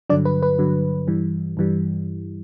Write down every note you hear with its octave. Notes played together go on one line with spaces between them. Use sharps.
G2 D3 F#3 D4 D5
B4
B4
G2 D3 F#3
G2 E3 G3
G2 E3 G3